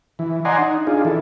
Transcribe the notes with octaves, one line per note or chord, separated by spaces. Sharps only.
E3
D5 D#5 F#5 G#5 A#5 C6
D#4
D4 D#4 F4 G#4
E3 A4